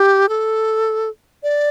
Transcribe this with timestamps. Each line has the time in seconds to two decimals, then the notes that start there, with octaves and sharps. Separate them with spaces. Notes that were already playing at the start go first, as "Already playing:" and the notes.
Already playing: G4
0.29 A4
1.43 D5